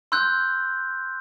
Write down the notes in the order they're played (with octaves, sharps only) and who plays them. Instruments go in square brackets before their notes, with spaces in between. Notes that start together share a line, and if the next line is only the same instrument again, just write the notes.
[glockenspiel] C6 E6 F#6 G6